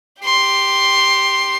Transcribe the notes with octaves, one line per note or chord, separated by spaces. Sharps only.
G4 C6